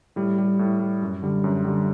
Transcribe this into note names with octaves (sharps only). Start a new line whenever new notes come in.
A2 G3
G3
A2
G3
F#2
D3 G3
F#2
D3 G3